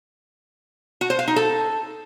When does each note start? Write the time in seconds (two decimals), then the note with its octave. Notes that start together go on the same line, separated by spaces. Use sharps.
1.01 F#4
1.10 C5
1.19 F5
1.28 D#4
1.36 A4